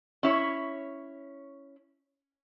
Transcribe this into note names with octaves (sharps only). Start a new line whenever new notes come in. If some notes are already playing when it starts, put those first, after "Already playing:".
C#4 E4 C#5